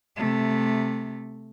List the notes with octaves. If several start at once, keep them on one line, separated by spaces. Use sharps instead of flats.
C3 A3